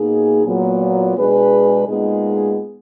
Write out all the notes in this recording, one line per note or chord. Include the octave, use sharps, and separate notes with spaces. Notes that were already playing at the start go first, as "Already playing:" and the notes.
Already playing: B2 A#3 D#4 G#4
A#2 F#3 B3
B2 G#3 D4 G#4 B4
A#2 G#3 B3 D#4 G#4